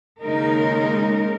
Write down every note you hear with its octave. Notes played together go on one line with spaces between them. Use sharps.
D#2 C#3 G#3 D#4 A#4